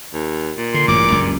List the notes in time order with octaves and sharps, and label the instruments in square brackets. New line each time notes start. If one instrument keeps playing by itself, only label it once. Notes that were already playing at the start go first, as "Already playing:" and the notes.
[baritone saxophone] D#2
A#2
[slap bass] D3 [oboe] C6
[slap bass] A1 G2 C#3 [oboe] D6
[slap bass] F#1 C#2 G2